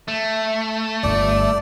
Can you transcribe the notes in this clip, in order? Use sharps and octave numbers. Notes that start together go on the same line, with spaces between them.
A3
G1 G2 D5